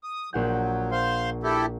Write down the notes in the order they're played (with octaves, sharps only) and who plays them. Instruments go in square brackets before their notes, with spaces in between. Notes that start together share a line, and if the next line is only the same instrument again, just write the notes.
[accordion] D#6
[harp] A#1 F#5 G6 [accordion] F#3
[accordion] C5 F5 C6
E4 G4 A4